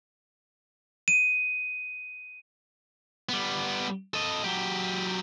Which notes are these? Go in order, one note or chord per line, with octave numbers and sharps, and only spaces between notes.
D#7
G3 B3
A4 D#5
F#3 G4